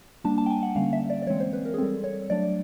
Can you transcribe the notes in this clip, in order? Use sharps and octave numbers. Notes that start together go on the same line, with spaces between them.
G3 A#3 D4 A5
A5
G5
G#5
F#5
D3 G3 A#3 C#4 F5
E5
D5
D5
E3 G#3 C4 C#5
C5
B4
A#4
G#4
G3 C4 A4
C#5
F#3 A3 D4 D5